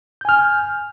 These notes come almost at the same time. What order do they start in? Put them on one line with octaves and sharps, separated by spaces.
G6 G#5 F6